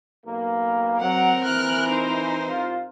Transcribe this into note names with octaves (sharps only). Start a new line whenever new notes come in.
B1 A#3
F#3 C4 A#4 F#5
E3 F6 F#6
D#4 C5
C2 F4